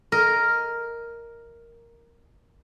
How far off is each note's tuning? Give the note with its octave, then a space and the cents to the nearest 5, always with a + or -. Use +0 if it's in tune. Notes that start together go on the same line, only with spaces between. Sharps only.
A#4 +0 D#5 +10